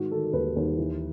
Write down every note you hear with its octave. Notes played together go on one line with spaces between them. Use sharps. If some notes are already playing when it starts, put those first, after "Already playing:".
Already playing: G#2 D#3 F#4
D#3 A4
A4
D#2 B4
D#2
E3